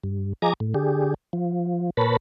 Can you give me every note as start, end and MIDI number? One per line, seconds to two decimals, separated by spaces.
0.03 0.33 43
0.42 0.53 53
0.42 0.53 68
0.42 0.53 75
0.42 0.53 80
0.42 0.53 82
0.42 0.53 86
0.60 0.74 45
0.74 1.14 50
0.74 1.14 67
0.74 1.14 68
1.33 1.90 53
1.97 2.17 46
1.97 2.17 70
1.97 2.17 71
1.97 2.17 73
1.97 2.17 81
1.97 2.17 83